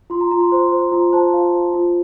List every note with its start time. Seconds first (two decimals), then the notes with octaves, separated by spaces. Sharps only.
0.10 F4 C6
0.21 A#5
0.31 F4 A#5
0.41 C6
0.52 C5 C6
0.72 C5
0.92 F4 A#5
1.13 C5 A5
1.33 F4 F5
1.53 C5
1.74 F4